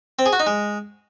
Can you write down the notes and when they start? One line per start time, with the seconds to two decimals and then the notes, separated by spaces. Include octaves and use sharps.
0.19 C4
0.26 G#4
0.33 F#4
0.40 D#4
0.47 G#3